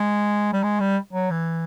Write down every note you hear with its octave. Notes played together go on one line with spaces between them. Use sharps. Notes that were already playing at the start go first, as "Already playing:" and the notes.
Already playing: G#3
G3
G#3
G3
F#3
E3